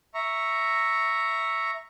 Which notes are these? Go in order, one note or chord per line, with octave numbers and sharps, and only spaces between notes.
E5 A#5 C#6